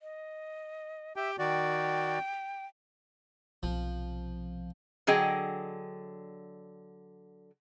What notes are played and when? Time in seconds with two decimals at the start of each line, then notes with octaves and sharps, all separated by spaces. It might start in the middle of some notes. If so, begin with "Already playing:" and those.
0.01 D#5
1.16 G4 E5 G5
1.39 D#3 F#4 D5 G5
3.63 B1 C3 F3
5.07 D3 F#3 G#4 D#5 G5